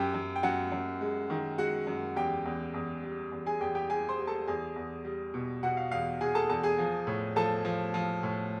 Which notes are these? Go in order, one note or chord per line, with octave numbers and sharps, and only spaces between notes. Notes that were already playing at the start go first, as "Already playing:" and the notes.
Already playing: F#2 G4 G5
F#2
G5
F#2 F#4 F#5
F#2
G#3
D#3
G#3 F#4 F#5
F#2
E2 G4 G5
E2
E2
G3
E2
G#4 G#5
E2 G4 G5
G4 G5
G3 G#4 G#5
C5 C6
G3
A4 A5
E2 G#4 G#5
E2
G3
B2
B2 F#4 F#5
F5
E2 F5
B2 G#4 G#5
A4 A5
E2 A4 A5
G#4 G#5
F3
A2
F3 A4 A5
F3
F3
A2